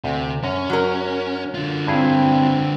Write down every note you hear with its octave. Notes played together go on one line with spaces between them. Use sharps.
D2 C3
F#2 C#4 A#5
F#3 A#4
D3 F4
G2 C4 E4 G#4